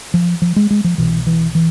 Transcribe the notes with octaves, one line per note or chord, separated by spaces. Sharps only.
F3
F3
G#3
G#3
F3
C2 B2 E3
E3
E3